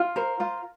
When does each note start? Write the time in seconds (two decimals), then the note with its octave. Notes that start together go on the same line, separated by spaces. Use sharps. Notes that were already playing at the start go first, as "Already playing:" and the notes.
Already playing: F4
0.16 A#4 C5
0.40 F4 C5